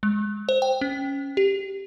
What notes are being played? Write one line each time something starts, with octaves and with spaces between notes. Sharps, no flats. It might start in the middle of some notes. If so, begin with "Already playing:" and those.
G#3
C5
G5
C#4
G4